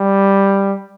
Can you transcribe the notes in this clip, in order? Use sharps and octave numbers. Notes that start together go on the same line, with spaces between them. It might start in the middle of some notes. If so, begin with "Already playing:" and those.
Already playing: G3